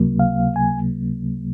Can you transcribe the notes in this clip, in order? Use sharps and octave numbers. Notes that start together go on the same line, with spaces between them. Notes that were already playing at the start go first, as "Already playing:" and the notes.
Already playing: C#2 C3 F#3 A#3
F5
G#5